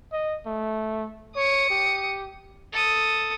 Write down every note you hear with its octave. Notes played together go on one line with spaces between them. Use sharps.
D#5
A3
C#5 D#6 C#7
G4
A4 D#6